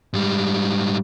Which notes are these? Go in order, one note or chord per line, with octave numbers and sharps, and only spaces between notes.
G#2 G3